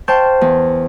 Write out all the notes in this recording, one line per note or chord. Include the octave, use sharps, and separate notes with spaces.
C5 F5 G5 A5 C#6 G6
E2